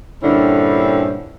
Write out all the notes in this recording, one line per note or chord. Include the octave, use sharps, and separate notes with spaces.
G2 A#2 D3 C4 C#4 E4